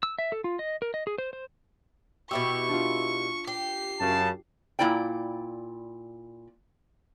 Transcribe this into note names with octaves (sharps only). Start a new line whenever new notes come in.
E6
E5
A4
F4
D#5
A#4
D#5
G#4
C5
C5
B2 E4 G4 C#6 E6
D4 F4
G4 C7
F#2 C#3 A5
A#2 A#3 E4 D5 G5